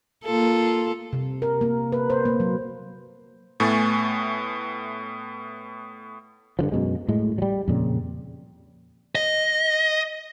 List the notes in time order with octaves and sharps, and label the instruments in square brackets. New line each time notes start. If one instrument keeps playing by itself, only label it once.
[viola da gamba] A#3 F4 A4
[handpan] C3
A#4
A#3
B4
C5
A#3
F#3
[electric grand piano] A2 A3 B3 G#5 C#6 A6
[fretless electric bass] G2 D3 F3
F#2 B2 G#3
A2 G#3
F#3 G3
F2 A#2 C#3
[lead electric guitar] D#5